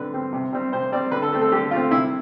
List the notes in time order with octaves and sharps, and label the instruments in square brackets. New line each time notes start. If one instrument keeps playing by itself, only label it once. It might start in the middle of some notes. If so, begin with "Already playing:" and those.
Already playing: [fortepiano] D3 G3 C4 B4
G3 C4
C3
G3 C4
C3 C5
G3 C4 D5
D3 B4
A4
A3 C4
A4
D3 G4
A3 C4 F4
C3 E4